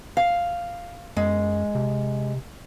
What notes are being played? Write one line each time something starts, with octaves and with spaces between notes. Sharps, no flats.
F5
F#2 G#3
C3